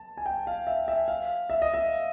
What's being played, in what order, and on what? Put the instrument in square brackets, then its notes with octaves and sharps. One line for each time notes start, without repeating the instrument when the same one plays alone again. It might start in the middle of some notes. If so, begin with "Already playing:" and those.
Already playing: [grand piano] A5
G#5
G5
F5
E5
E5
F5
E5
D#5
E5